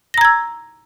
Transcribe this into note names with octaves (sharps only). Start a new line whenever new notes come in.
A#5 E6 G#6 A#6